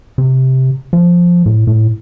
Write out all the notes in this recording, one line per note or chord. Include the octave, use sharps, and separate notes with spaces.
C3
F3
A2
A2